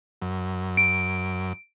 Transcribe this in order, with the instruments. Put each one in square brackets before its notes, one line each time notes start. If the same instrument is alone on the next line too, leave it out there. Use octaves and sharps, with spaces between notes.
[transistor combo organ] F#2
[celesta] D7